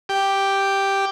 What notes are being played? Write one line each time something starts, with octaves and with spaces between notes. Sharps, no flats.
G4